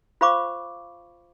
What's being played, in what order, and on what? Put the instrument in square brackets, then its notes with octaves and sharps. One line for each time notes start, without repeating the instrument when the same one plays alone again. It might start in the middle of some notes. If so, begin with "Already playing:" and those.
[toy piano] F4 C5 F5 B5 C#6 D6